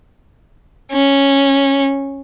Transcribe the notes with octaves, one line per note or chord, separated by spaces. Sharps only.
C#4